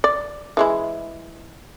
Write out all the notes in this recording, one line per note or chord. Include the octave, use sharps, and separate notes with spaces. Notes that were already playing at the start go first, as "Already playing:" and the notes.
D5
E3 G#3 E4